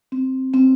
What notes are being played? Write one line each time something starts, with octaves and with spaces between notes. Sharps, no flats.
C4
C4